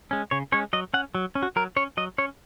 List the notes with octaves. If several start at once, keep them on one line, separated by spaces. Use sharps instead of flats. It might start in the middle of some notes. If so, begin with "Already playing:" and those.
G#3 C#4
C#3 C#5
G#3 C#4 C#5
F#3 D#5
C#4 F#5
F#3
C#4
F#4
F#3 A#4
C#4 C#5
F#3 D#5
C#4 C#5